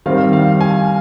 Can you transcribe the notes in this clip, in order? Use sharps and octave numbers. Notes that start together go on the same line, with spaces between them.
D#3 G3 C4 F5
F5
G#5